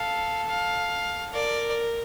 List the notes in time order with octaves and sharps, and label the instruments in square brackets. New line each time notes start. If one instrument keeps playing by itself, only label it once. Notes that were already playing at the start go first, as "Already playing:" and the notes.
Already playing: [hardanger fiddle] A4 [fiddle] F5
[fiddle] F5
[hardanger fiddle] A#4 [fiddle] D5